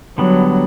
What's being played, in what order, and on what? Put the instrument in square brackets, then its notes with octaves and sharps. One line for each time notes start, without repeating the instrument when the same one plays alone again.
[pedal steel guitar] D3 G3 B3 D4 [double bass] F#3